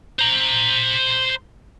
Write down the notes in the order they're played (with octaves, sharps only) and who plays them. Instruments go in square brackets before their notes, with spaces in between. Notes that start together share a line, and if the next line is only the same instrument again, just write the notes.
[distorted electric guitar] C5 A#5